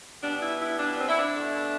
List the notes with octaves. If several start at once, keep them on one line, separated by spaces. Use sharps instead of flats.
B2 G3 B3 D4
E4
E4
D4
C4
E4
D4
B2 A3